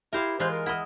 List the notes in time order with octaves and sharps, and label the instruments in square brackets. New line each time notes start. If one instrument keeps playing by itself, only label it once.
[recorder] E4 [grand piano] G4 E5 [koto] A#4 C5 F5
[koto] E3 G#3 F4 [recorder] C5
[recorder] A#4
[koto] E4 D#5 [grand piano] F#5 D#6 F6